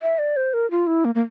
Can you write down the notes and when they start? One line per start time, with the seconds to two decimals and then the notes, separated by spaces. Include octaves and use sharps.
0.02 E5
0.19 D5
0.37 C5
0.54 A#4
0.71 F4
0.87 E4
1.05 A#3
1.15 A#3